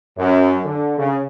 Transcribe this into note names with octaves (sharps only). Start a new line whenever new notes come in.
F#2
D3
C#3